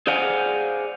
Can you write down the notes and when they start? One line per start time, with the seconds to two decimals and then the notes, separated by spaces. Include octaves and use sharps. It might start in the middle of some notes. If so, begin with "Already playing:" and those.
0.07 G#4 C5 D5 F5 F#5 G#5